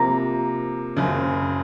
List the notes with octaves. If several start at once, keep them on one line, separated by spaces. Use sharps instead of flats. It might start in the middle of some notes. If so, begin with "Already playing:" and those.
Already playing: C3 F3 A#3 A#5
F#1 F#2 C#3